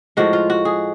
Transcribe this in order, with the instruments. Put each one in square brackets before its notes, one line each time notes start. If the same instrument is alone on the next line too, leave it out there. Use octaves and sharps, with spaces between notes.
[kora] A2 F3 G#3 F#4
F4
F#4
G#4